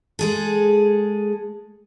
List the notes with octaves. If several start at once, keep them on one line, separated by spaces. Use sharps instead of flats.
G#3 G#4 A4